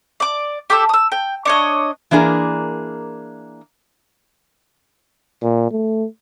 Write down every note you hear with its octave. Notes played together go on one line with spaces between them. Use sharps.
D5 D6
G4 A4 D6 E6
D#6 E6
G5
D4 C#5 D#5
E3 A#3 D4 G#4 A#4
A#2
A3